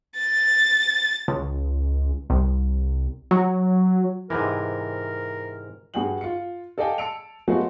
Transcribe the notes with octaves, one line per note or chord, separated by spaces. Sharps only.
A6
C#2
C2
F#3
G#2 C3 E3 A#4
G2 F#4 G#4 F#5 G5 F#7
F4 C#7
A4 D5 D#5 F5 G5 G#5
A5 E6 C#7 D7 F7
F#3 G#3 A3 B3 F4 F#4